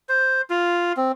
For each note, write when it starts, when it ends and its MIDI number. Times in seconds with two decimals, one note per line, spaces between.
0.09 0.42 72
0.50 0.93 65
0.97 1.12 60